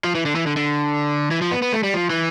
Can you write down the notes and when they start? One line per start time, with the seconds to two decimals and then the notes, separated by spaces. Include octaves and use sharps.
0.04 F3
0.15 E3
0.25 D3
0.35 E3
0.46 D3
0.57 D3
1.31 E3
1.42 F3
1.51 B3
1.62 B3
1.73 A3
1.83 G3
1.94 F3
2.10 E3